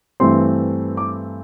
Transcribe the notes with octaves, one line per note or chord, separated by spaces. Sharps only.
G2 E3 A3 C4 C6
D6